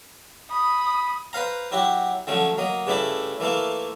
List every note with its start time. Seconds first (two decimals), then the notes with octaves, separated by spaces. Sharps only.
0.51 B5 D#6
1.33 B4 C5 F5 A#5
1.72 F#3 E4 F#4 G4
2.27 D3 F3 F#3 A3 C#4
2.58 F#3 A#3 D#5
2.87 G2 C#3 A3 E4 B5 D6
3.40 E3 A3 A#3 E4 F4